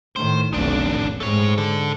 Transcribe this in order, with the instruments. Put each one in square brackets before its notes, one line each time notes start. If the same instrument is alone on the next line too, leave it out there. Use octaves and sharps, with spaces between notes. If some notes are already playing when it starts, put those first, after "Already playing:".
[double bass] A2 D#3 [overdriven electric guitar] C5
[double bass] F1 B1 [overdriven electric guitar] D#3 D4
[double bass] A1
[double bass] G#2 [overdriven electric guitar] A3 C#5
[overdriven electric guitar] A4 D5